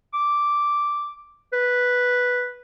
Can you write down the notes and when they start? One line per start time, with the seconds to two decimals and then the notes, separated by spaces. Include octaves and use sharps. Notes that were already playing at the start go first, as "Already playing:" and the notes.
0.14 D6
1.53 B4